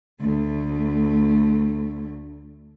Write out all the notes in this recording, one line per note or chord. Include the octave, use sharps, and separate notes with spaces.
D2 A3